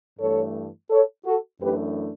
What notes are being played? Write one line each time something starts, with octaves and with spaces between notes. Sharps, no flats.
G2 E3 A3 A4 C#5
A4 C#5
F#4 A4
F#2 E3 A3 D4 G4 B4